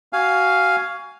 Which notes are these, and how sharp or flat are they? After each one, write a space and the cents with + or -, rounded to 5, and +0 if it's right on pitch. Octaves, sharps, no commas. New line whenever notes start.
F#4 +20 F5 +0 G#5 +0